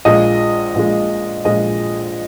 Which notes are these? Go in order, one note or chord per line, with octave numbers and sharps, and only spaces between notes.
A#1 A#2 G#3 D#5
A#1 A#2 G#3
A#1 A#2 G#3 D#5